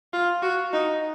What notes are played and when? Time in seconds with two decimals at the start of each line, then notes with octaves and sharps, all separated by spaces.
0.13 F4
0.42 F#4
0.73 D#4